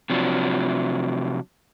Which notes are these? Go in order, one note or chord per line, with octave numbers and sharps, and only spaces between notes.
C3 F3 F#3 D4